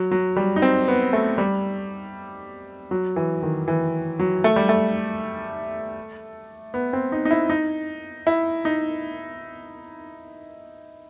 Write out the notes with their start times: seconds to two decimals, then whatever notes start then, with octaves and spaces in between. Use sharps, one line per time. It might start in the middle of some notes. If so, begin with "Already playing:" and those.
Already playing: F#3
0.11 F#3
0.36 G3
0.56 D#4
0.62 C4
0.88 B3
1.13 A3
1.38 G3
2.91 F#3
3.16 E3
3.43 D#3
3.68 E3
4.19 F#3
4.44 A3
4.56 G3
4.69 A3
6.74 B3
6.93 C4
7.12 D#4
7.25 D#4
7.31 E4
7.50 D#4
8.27 E4
8.65 D#4